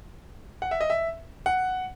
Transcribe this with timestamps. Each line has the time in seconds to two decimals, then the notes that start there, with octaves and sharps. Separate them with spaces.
0.62 F#5
0.71 E5
0.81 D#5
0.90 E5
1.46 F#5